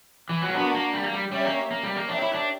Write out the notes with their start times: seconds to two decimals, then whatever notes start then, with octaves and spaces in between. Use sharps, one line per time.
0.29 E3
0.42 F#3
0.50 A#3
0.55 B3 D4 F#4 A#4
0.74 A#3
0.94 G3
1.03 A#3
1.13 G3
1.32 G3 C#4 G4 C#5 E5
1.45 A#3
1.71 A#3
1.83 G3
1.96 A#3
2.09 D4 G4 A#4 C#5 E5 G5
2.22 E4
2.34 D4